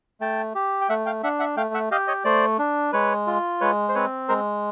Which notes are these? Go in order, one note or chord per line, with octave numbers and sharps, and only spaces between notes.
A3 G5 A5
G4
G5
A3 E5 F#5
F5 G5
D4 E5 F#5
E5 F#5
A3 F5 G5
E5 F#5
G4 D#5 F5
C#5 D#5
A3 C5 D5
D4
G#3 B4 C#5
F4
G#3 B4 C#5
C5
C4 B4 C#5
G#3 A#4 C5